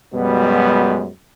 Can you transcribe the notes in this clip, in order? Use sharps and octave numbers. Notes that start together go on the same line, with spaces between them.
F#2 B2 G3 G#3 B3